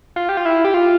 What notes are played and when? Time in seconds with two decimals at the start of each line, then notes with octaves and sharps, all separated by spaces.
0.16 F4
0.29 G4
0.37 F4
0.45 E4
0.65 G4
0.74 F4